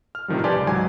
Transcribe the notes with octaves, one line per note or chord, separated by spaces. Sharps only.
F6
A2 C3 D#3 F3 G3
G4 B4 D5 G#5 A5 C6
C#2
G#2 F#3 D#4 G#5